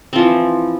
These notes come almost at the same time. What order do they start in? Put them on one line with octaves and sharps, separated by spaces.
C4 F3 E3